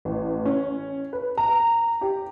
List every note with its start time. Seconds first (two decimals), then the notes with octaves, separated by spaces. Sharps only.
0.05 A1
0.45 C#4
1.13 B4
1.38 A#5
2.01 G4